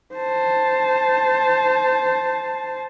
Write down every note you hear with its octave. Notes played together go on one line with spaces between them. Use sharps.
C5 A5